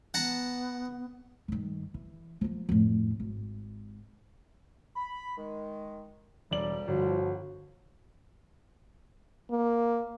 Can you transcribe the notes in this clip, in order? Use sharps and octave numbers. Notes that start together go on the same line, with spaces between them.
B3 F#5 A5 A#5
G2 D#3
E3
F3 A#3
F2 A2
G#1
B5
D#3 G#3
E1 D2 G3 D5 F#7
G1 F3 F#4
A#3